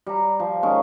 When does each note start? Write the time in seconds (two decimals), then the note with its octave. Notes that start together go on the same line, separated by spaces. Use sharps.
0.07 G3 A#5
0.40 F3
0.63 D#3 G#3 C#4